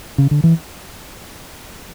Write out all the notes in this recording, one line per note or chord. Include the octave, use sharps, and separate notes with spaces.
C#3
D3
E3